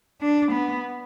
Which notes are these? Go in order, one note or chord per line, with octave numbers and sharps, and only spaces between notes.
D4
B3